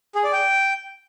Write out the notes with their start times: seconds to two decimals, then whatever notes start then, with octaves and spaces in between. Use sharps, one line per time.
0.15 G#4
0.24 D5
0.33 G5